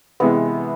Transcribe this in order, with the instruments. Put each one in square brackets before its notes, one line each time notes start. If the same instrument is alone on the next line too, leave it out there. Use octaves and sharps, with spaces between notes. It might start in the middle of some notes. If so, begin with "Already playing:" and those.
[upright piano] C3 E3 G#3 [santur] B3